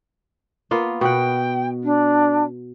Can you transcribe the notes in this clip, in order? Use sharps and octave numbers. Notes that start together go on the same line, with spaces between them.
A#3 B3 F4
B2 F#5 G5
D4